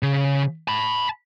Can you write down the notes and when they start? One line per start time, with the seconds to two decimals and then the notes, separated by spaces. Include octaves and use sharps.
0.03 C#3
0.68 A5 B5